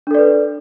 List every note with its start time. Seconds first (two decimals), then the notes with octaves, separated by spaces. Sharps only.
0.07 D4
0.11 A4
0.14 D5
0.18 B4